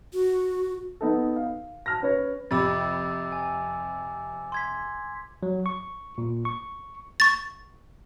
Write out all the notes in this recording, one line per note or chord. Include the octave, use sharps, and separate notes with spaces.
F#4
B3 D#4 A4
F5
A5 F6 A#6
C#4 B4 C#5
F2 C3 B5 D6 E6 A6
G#5
C6 G#6 B6
F#3
C#6
A#2
C#6
C#6 A6